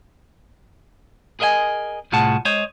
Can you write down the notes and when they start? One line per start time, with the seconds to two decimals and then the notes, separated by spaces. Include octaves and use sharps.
1.40 G#4 A#4 D#5 E5 G#5
2.12 C2 A2 F4 G#4 F#5 A5
2.45 G#3 C5 C#5 D#5